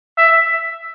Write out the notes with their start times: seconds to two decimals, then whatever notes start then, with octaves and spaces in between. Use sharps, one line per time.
0.17 E5